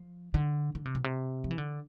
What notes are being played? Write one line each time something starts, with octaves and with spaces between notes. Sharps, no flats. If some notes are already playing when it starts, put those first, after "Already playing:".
Already playing: F3
D3
D3
C3
B2
C3
F3
E3
D3